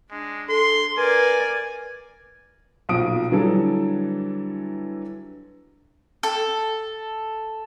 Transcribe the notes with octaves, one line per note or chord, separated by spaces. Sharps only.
G#3 D4
A4 C6
A#4 B4 D5 G#5
B1 A#2 F3 D#6 D7
D3 E3 F#3 G3 A4
A4